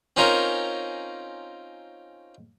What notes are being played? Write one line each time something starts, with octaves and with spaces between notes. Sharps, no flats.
C4 C#4 D#4 F4 A#4 C#5